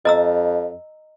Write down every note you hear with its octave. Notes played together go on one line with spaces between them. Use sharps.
F2 D#5 A#5 E6